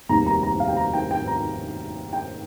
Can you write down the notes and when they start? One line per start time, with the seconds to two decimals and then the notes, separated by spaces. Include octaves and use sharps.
0.09 F1 D#2 D#3 G3 A#3 A#5
0.27 A#5
0.43 A#5
0.60 F5
0.68 G5
0.77 A#5
0.93 G5
1.11 G5
1.27 A#5
2.13 G5